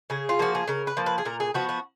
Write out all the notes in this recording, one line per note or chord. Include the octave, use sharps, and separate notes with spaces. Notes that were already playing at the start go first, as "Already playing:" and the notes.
C#3 G#4
F4
F3 A#3 F#4
G#4
C#3 A#4
B4
F3 A#3
B4
G#4
A#2 A#4
G#4
F3 B3 F#4
F#4